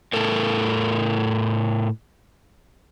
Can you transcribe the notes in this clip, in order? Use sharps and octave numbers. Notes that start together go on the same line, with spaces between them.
A2 A4 A#4